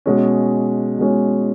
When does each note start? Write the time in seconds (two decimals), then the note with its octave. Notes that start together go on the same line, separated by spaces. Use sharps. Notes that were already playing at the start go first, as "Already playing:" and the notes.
0.06 B2 G#3 C#4
0.98 B2 G#3 C#4